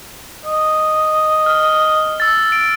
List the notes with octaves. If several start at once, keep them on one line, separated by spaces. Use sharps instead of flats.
D#5
F6
E6 A6
D7